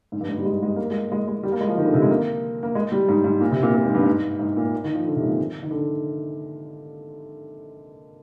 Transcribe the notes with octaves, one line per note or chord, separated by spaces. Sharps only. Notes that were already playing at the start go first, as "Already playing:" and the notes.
G#2
G2
G#2
G3
G#3
G#3
A#3
G#3
G#3
G#3
G3
A#3
G#3
F3
D#3
D3
C3
G#3
A#3
A#3
G#3
G3
G#2
G#2
A#2
C3
A#2
A#2
G#2
G2
G#2
G#2
A#2
D#3
F3
D3
C3
G#2
A#2
D#3
D3